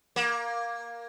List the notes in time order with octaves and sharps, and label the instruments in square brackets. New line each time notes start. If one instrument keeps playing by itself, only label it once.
[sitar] A#3